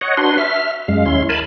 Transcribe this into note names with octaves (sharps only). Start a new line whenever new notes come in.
C#5 D#5 F#5
D4 F#4 B4 C6
E5 F6
F#2 G#3 F5
D#2 C#4 E4 C6
A#4 G#5 A5 B5